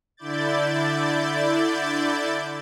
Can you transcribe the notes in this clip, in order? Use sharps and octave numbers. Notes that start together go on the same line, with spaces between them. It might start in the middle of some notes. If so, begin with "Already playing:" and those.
D3 E4 D5 G6 A6